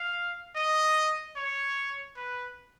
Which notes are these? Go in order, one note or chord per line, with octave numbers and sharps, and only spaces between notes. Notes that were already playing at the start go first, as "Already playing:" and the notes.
Already playing: F5
D#5
C#5
B4